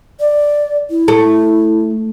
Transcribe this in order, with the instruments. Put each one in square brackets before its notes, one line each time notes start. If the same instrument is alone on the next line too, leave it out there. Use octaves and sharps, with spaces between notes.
[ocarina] D5
E4
[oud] A3